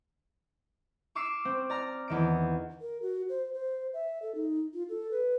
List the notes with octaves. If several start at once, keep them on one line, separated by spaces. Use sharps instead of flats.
C#6 D6 E6 F6 C7
C4
D5 A#5 F6
E2 D#3 D7
A#4
F#4
C5
C5
E5
A4
D#4
F4
A4
B4